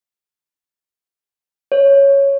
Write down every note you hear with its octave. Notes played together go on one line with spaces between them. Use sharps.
C#5